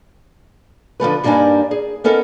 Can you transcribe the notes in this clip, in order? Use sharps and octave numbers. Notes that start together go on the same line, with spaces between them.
D3 F3 A3 B4
G2 G3 A#3 D4 D#4 G#5
G#4
B3 C#4 D#4 A4 A#4